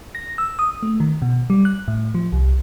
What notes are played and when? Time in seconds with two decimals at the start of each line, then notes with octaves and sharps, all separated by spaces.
0.15 A#6
0.38 E6
0.59 D#6
0.83 A3
1.00 D#3
1.22 B2
1.50 G3
1.65 F#6
1.88 A2
2.15 F3
2.33 C2